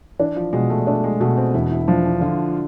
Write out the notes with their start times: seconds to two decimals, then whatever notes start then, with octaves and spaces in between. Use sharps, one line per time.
0.19 E3 D4
0.36 F3
0.53 B2 G#3
0.70 A3
0.87 A3 D4
1.04 G#3
1.20 B2 A3
1.37 C4
1.54 E1 E4
1.71 E4
1.88 F3 D4
2.05 D4
2.21 D3 F4